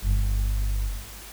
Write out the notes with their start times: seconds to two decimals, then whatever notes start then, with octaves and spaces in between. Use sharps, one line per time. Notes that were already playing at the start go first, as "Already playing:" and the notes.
0.02 G1